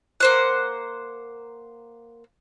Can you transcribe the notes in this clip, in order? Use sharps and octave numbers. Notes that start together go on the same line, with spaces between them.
A#3 C5 F#5